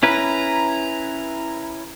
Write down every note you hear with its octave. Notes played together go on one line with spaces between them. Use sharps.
C#4 E4 B4 A#5